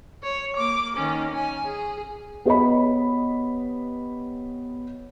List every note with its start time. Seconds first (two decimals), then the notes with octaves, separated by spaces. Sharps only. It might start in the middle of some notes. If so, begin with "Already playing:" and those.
0.23 C#5
0.56 A#3 D6
0.96 D#3 C#4
1.31 C#4 G#5
1.66 G#4
2.45 B3 G4 C#5 D#5 B5